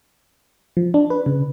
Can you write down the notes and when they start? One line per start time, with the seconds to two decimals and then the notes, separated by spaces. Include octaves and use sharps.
0.77 F3
0.94 D4
1.10 B4
1.26 C#3